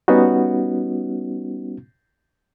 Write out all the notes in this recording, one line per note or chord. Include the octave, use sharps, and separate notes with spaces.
G3 B3 C#4 D#4 F#4